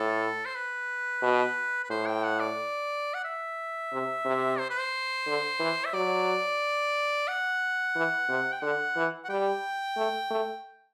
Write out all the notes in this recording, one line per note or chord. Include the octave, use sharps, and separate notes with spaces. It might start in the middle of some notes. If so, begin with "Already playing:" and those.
Already playing: A2 A4
C5
B4
B2
B4
A2 C5
G5
F#5
D5
F#5
E5
C3
C3
C5
B4
C5
D3
E3
E5
F#3 D5
F#5
E3
C3
G5
D3 F#5
E3
F#5
G3 G5
A3
A3